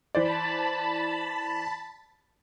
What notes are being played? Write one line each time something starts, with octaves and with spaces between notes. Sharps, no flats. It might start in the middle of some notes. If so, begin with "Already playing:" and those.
E3 C5 D5 A5 B5